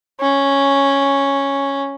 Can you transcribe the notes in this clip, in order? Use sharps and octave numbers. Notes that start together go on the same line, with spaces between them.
C#4